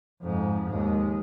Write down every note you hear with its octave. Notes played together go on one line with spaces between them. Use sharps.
F2 G#2
D#2 G#3